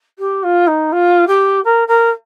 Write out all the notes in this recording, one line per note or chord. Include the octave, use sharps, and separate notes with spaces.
G4
F4
D#4
F4
G4
A#4
A#4